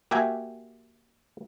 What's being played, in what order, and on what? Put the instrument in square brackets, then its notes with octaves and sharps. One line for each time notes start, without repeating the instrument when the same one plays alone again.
[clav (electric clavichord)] A#3 F#4 G4 E5 G5 G#5